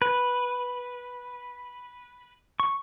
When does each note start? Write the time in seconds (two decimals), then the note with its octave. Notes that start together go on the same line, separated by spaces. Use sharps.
0.02 B4
2.60 C#6